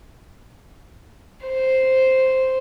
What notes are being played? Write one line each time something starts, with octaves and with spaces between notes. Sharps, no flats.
C5